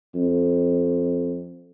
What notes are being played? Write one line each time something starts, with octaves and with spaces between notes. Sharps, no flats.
F2